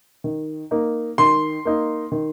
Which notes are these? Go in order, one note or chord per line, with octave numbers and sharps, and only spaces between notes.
D#3
A#3 D#4
D#3 C6
A#3 D#4
D#3